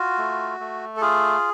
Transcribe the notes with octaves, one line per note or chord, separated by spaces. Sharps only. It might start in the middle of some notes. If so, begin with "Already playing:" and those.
Already playing: F4 F#4
A3
A3
A4
F4 G#4